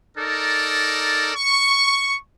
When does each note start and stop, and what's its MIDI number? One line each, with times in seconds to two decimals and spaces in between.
0.17 1.32 63
0.17 1.32 69
0.17 1.32 70
0.17 1.32 74
1.34 2.15 85